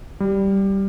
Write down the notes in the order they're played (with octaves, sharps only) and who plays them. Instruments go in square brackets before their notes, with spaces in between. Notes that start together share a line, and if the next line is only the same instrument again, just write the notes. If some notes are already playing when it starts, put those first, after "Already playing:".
[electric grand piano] G3